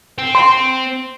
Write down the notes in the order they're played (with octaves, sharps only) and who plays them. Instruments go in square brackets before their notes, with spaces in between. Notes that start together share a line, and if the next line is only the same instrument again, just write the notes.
[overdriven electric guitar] C4
[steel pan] C6